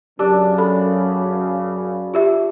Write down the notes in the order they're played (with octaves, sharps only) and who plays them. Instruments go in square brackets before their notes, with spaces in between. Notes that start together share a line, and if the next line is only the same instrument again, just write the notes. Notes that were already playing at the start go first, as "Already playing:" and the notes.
[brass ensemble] F#2 C#3 [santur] D4 [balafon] G4
[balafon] A4 [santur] B5
[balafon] F4 G4 E5